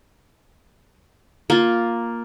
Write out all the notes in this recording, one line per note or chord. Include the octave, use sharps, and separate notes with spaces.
A#3 F4